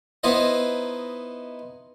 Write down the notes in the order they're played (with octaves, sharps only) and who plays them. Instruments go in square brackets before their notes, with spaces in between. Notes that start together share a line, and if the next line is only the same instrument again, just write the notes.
[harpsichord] B3 D#4 E4 C5 D#5